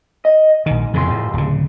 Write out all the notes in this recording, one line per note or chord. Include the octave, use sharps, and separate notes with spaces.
D#5
A#1 G#2 D#3
C2 F2 C#3 E3 G#4 C6
A2
D1 C#3